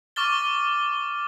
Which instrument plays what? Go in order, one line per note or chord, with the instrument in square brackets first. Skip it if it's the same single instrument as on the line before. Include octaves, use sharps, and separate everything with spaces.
[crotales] C#6 D6 F6 A6 G7